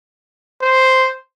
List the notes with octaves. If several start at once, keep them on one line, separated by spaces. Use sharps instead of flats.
C5